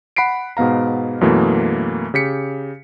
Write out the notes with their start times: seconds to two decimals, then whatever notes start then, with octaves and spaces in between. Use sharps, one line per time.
0.16 F#5 B5 B6 C7 D7
0.57 G#2 B2 B3 F5 A#5
1.21 F#2 B2 E3 A3 A#3
2.14 C#3 G4 B6 C#7